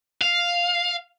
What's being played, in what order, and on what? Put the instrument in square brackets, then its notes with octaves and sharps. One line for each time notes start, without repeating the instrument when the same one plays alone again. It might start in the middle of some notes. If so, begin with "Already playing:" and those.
[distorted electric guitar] F5